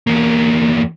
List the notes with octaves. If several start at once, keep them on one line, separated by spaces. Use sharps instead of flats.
E2 A#3